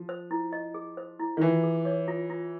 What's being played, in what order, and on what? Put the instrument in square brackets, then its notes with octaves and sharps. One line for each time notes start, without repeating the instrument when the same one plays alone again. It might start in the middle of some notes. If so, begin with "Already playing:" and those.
Already playing: [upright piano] F3
[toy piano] C5
E4
D#5
G#4
C5
E4
[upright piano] D#3
[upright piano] E3 [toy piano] F4
[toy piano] G#4
C#5
F4
F4